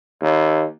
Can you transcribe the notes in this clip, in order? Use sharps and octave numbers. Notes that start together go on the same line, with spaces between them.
D#2